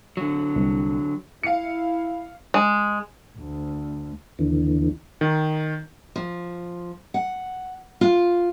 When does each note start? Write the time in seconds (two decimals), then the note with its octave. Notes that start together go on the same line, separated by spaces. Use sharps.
0.17 D3 F#3
0.56 C2
1.43 E4 F5 C#7
2.54 G#3
3.37 D2
4.39 D#2 D3 E3
5.21 D#3
6.16 F3
7.14 F#5
8.01 F4